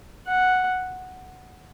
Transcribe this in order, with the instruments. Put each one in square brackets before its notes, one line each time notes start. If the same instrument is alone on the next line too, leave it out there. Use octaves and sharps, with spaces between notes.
[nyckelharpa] F#5